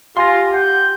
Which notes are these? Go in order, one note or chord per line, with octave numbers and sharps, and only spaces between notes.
F4 G4 F5 G#5 C6 A#6
F#5 G6